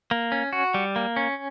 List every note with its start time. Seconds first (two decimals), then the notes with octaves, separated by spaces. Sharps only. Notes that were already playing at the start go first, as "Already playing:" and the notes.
0.11 A#3
0.32 C#4
0.53 F#4
0.74 G3
0.96 A#3
1.16 C#4